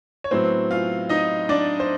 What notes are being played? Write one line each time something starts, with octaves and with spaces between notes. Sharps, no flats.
C#5
A2 F#3 B3 C4 C5
F4 F5
D#4 D#5
D4 D5
C5